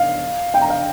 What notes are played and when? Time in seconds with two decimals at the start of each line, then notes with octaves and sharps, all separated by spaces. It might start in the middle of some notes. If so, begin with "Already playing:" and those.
Already playing: F5
0.54 G5
0.62 A#5
0.70 F5